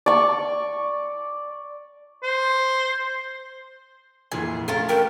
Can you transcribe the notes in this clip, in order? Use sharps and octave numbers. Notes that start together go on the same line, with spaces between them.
D5 C#6
C5
F1 A#2 E3 G#4
A3 C#4 F4 A#4
G4 A#4